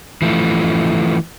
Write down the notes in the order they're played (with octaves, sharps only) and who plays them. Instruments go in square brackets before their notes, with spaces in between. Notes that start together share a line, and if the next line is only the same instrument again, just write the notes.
[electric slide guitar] E3 F3 A3